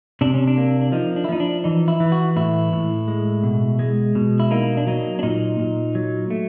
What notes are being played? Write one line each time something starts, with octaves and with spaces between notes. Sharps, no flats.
C3 D4
C#4
D4
A#3
D4
F3 D#4
D4
E4
F3 D#4
D4
E3 D#4
E4
E3
F#4
A2 E4
A2
G#3
B2
G#3
B2
E4
A#3 D#4
D4
F#3 D#4
D4
A#2 D#4
A#2
F#3
A3